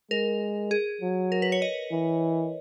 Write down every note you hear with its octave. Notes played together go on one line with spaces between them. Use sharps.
G#3 A#4
G#4
F#3
A#4
B4
C#5
D#5
E3